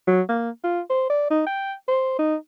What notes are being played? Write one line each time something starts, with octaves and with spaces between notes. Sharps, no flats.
F#3
A#3
F4
C5
D5
D#4
G5
C5
D#4